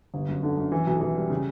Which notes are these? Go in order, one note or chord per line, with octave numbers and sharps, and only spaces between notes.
G1
F#2
D3
F#2
E3
B1
E3
G3
C#3